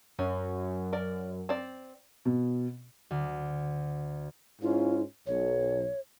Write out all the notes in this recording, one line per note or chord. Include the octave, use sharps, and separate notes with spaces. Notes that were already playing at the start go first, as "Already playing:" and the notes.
F#2 C#4
A#4 D5
C4 D5
B2
D2
G#2 C#4 E4 F4
B1 C#5